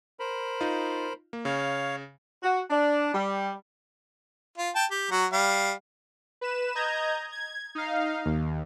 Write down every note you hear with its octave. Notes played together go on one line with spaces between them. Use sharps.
A#4 C5 B5
D#4 F4
A#3
C#3 C#5 F5
F#4
D4
G3
F4
G5 A5
G4
F#3 F#4
G3 F5
B4 E7
D#5 A#5 G6 G#6
G#6
D#4 F5
D#2